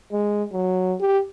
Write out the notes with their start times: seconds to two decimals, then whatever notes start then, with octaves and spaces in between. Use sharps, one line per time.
0.12 G#3
0.53 F#3
1.00 G4